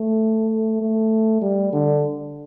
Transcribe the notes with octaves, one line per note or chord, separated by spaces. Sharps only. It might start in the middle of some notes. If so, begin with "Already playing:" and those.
Already playing: A3
A3
G3
D3